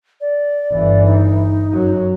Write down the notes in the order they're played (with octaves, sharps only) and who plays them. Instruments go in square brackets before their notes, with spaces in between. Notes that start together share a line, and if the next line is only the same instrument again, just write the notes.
[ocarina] D5
[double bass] G1 E3
[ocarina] D#4
[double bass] F#2 F#3